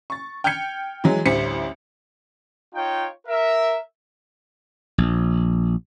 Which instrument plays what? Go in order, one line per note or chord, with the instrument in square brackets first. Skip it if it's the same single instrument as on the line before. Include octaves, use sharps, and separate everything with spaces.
[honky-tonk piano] C#6 A6
G5 F6 G6 G#6 C#7
E3 F#3 G#3
A1 D2 G3 C5 B6 C#7
[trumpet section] D#4 F4 C#5 G5
A#4 E5
[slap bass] A#1